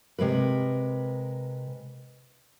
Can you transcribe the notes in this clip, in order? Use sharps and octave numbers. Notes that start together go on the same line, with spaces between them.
C3 G#3 A#4 B4